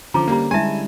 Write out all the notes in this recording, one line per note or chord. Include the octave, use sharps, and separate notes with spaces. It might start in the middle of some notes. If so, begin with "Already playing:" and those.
D3 F3 C#4 A#5 D6
G3 A#3 C5 A#5
G3 G#3 E4 G4 E5 G#5 A5